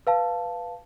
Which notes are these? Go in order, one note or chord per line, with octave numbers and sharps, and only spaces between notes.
B4 F5 A5